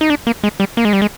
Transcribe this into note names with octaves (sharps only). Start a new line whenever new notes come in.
D#4
D4
A#3
G#3
G3
A#3
G#3
G3
G#3